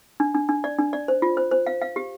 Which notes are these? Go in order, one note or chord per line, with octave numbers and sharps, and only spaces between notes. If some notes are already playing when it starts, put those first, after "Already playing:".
D4
D4
D4
D5
D4
D5
C5
F4
C5
C5
F5
F5
G4